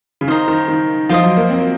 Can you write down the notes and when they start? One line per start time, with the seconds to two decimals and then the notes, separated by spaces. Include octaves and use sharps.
0.21 C#3
0.27 D#3 C5 D#5 A#5
0.48 D#3
0.68 D#3
1.09 F3 F4 C5 D#5
1.23 F#3
1.37 A#3
1.50 C4